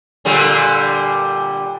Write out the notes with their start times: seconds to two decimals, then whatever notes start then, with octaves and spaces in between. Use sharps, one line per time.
0.25 A#2 D3 G3